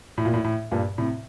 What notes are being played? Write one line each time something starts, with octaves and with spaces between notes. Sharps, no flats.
A2
A#2
A2
A2
G2 A#2
A2 C3